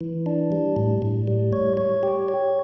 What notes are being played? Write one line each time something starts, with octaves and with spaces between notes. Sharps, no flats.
E3
D4
G3
A2
A2
G3
C#5
C#5
G4
C#5